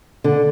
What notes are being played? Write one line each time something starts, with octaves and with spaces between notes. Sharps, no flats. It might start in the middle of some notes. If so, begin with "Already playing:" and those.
D3